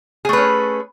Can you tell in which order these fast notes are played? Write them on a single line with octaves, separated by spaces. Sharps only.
G#4 A3 B4 C#4